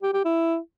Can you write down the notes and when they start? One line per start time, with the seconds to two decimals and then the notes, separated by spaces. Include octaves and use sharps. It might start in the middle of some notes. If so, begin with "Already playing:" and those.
0.02 G4
0.14 G4
0.25 E4